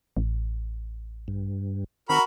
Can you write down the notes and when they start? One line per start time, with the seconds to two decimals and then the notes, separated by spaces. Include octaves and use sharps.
0.17 A1
1.28 G2
2.09 D#3 C4 F#4 A#4 B5